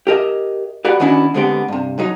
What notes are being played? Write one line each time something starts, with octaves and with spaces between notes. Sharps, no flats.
G4 A#4 D#5 E5
F#4 G4 B4 D5 F#5
D#3 B3 C#4 D4 E4 F#4
D3 G#3 B3 C4 G4
G2 C3
B1 F#3 D#4